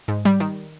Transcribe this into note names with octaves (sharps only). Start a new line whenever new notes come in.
G#2
G3
D#3